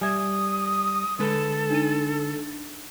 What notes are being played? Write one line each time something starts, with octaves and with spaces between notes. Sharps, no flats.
G3 E5 G#5 D#6 G#6
D3 G#3 A4 B4
D4 D#4 D#7